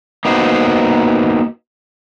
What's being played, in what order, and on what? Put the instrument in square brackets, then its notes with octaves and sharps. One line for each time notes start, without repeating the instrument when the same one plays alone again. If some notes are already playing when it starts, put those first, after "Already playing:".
[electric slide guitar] A#3 B3 D#4 F#4 C5